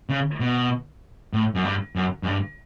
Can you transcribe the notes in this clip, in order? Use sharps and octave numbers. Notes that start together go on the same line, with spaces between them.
C#3
B2
A2
F#2
G2
F#2
F#2
G2